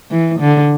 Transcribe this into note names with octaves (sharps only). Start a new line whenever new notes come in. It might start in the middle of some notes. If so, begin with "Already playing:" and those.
E3
D3